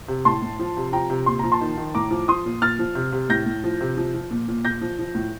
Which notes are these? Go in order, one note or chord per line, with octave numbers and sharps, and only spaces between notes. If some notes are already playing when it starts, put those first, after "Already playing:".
C3
A2 A5 C6
A2
F3
C3
F3 G5 A#5
C3
A#2 C6
F3 A#5
A5 C6
D#3
D#3
A2 A#5 D6
F3
F3 C6 D#6
A#2
A#2 F6 A6
F3
C3
C3
A2 G6 A#6
A2
F3
C3
F3
F3
A#2
A#2
A#2 G6 A#6
F3
F3
A2